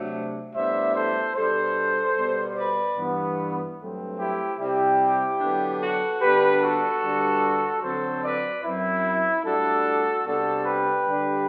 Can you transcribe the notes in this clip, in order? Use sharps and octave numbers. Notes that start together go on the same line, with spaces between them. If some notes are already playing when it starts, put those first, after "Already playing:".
Already playing: C3 F#3 A3 D4
A2 G3 B3 D4 C5 E5
A4 C5
B2 G3 D4 A4 C5
B2 G3 B3
B4 D5
G2 E3 B3
G2 F#3 A3 C4
E4 G4
C3 G3 C4 E4 G4
D3 F#3 B3 D4
F#4 A4
D3 G3 B3 D4 G4 B4
F#4 A4
G2 D3 G3 D4
D3 F#3 C4 A4 C5
B4 D5
F#2 F#3 C4 E4
A2 G3 D4 F#4 A4
C3 G3 B3 D4 F#4 A4
G4 B4
D3 G3 D4